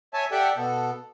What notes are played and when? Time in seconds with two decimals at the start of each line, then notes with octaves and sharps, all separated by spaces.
0.14 C#5 E5 G#5 A5
0.32 G4 A4 D5 E5 F#5 G5
0.56 B2 B3 A4